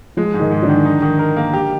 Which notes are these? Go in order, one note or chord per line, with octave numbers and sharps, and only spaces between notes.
F3 G#3 F4
G#2
D#3 D#4
G#2
D3 D4
D#3
D#4
D#3
A#4
A#3
G4